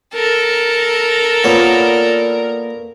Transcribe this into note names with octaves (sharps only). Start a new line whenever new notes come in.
A4 A#4 A#5
A#2 B3 C#5